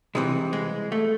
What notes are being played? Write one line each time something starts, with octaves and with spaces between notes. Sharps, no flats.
C2 C3 E3 G#3
G#3
A3